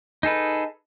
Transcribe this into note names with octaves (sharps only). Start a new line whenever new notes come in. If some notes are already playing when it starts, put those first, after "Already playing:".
D#4 G#4 A4 B4